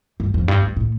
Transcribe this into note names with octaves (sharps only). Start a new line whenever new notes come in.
G2
F2
G2
G2
A2